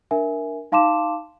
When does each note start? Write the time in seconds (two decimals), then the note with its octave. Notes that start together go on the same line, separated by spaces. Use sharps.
0.11 D4 A#4 E5 G#5
0.72 D#4 F5 A5 C6 D6 E7